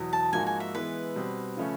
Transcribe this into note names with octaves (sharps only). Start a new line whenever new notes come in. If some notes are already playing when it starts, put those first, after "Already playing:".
Already playing: E2 B2 F#3
A5
G#2 F3 A#3 D#4 F#4 G#5
G#5
E5
E3 G#3 B3 E4 B4
B2 G3 C4
C#3 F3 A3 C#4